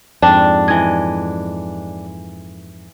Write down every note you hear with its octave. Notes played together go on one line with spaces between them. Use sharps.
F2 G#2 D4 D5 G5 A5
E3 D#5 G#6